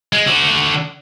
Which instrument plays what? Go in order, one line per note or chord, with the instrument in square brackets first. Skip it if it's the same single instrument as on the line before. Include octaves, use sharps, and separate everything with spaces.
[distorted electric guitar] G#3
D3 F#4